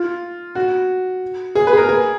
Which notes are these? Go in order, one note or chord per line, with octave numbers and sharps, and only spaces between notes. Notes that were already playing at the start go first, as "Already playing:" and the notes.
Already playing: F4
F#4
G#4
B4
G#4
A#4
G#4